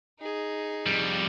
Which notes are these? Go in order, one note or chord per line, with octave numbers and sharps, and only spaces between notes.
D#4 G#4
F2 G3